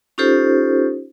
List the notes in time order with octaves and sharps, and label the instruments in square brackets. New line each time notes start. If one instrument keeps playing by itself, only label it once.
[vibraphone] C#4 D#4 F4 G4 A4 C5